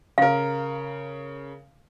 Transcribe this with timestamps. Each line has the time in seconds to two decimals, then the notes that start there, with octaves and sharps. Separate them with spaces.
0.18 C#3 A#4 F5